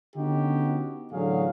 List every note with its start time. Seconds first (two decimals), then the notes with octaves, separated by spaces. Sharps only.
0.16 D3 B3 C#4 D#4 F#4 G4
1.12 A1 E2 D3 F#3 G#4 F5